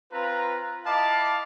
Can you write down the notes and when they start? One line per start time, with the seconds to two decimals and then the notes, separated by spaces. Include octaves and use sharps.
0.13 C4 F4 B4 A#5
0.86 E4 D#5 F5 A5 B5 D6